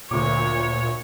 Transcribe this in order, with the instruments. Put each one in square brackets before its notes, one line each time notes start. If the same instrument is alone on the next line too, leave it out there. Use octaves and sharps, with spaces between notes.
[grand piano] D2 D6 [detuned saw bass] A#2 [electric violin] C#5